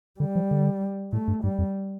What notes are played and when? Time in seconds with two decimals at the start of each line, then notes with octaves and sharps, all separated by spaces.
0.20 D3 G3
0.36 F3
0.51 D3
1.12 A2 A3
1.28 G2
1.43 G2 G3
1.59 F2